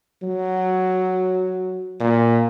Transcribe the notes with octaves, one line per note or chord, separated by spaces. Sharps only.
F#3
A#2